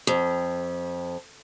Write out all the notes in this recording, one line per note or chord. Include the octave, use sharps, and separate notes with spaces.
F2